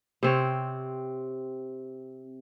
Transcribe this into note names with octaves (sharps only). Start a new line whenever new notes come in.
C3 C4 C#5